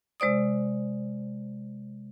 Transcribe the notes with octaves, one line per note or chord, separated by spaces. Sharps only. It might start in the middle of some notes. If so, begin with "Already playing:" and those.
C3 G#3 C5 D5 D#6